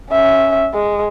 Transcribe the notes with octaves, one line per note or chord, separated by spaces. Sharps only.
C#4 E5
G#3